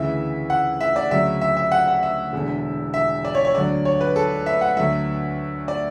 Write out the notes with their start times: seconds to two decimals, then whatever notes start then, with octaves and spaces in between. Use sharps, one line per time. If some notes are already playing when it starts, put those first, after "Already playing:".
Already playing: D2 C#3 E3 E5
0.50 F#5
0.81 E5
0.96 D5
1.11 D2 C#3 F#3 E5
1.41 E5
1.57 E5
1.72 F#5
1.87 F#5
2.03 E5
2.33 E1 E2 D3
2.94 E5
3.25 D5
3.35 C#5
3.45 C#5
3.55 D2 D3 F#3 D5
3.85 C#5
4.01 B4
4.16 A4
4.46 E5
4.61 F#5
4.77 D2 D3 F#3 E5
5.68 D5